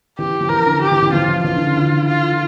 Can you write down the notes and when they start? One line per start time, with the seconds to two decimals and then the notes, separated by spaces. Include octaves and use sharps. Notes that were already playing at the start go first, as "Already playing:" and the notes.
0.18 E3 G4
0.41 F3
0.49 E3 A#4
0.66 D3
0.81 C#3 G4
0.92 E3
1.02 E3
1.13 F3 F4
1.28 E3
1.44 E3 F4
1.56 D3
1.66 C#3
1.77 D3
2.08 F4